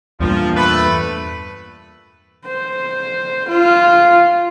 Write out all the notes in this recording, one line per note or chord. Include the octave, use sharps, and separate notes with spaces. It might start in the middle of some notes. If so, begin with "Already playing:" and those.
E2 G2 A#2 F3
A3 B4
C5
F4